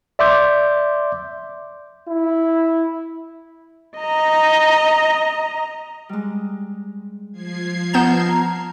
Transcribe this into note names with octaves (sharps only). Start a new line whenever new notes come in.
D5 E5 C6 D6 G6
E4
D#5 A#5
G3 G#3
F3 G#6 C7
B3 D#5 A5 A#5 F6 G6 E7